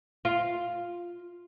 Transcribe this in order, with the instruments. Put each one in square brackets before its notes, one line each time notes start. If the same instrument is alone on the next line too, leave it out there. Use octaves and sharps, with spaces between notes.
[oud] F4